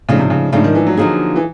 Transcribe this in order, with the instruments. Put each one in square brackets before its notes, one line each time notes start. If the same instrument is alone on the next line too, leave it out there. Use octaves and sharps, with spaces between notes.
[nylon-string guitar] G#2 F3 A3 D4 [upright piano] C#3
[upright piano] C3
C#3
[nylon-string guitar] G#2 F3 A3 D4 [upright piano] C#3
[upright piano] D#3
E3
F#3
[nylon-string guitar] D3 F3 A#3 D#4 G#4
[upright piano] E3